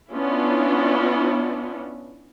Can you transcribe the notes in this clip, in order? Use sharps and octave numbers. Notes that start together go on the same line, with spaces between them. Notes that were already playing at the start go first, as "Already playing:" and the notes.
B3 C#4 D4 E4 F4